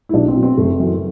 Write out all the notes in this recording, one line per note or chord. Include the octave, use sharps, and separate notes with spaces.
E4
B1 D4
C4
B2
C4
F#1 A3
F#2 E3